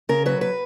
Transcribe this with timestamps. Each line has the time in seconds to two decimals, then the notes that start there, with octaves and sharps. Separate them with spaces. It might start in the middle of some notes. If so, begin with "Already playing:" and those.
0.09 C#3 A#4
0.26 F#3 B4
0.41 B4